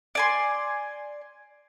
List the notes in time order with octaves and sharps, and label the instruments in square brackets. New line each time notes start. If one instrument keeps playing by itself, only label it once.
[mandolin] D5 G#5 C6